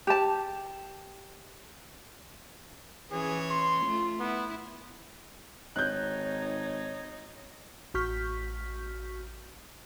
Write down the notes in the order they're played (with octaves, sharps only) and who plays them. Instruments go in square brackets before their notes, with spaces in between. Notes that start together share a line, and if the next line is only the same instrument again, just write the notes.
[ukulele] G4 A5
[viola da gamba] E3 C#4 C#5 [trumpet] G#4
[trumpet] C6
[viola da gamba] A3 F4
[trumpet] B3 [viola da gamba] E4
[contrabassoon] G#1 [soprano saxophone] D#4 [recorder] C#5 [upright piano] F#6 G6
[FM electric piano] A1 F#4 C#6 F6 G6 B6